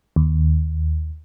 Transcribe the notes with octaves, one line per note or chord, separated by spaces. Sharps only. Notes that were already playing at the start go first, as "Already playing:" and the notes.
D#2